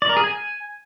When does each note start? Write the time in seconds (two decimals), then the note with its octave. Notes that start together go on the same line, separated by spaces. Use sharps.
0.02 D5
0.09 A#4
0.17 G#4
0.24 G#5